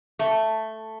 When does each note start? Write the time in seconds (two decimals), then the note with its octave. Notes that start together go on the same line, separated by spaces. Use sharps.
0.19 A3